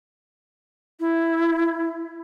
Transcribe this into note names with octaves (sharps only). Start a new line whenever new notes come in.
E4